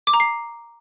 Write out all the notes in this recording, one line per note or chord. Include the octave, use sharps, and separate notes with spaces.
D6
A#5
C7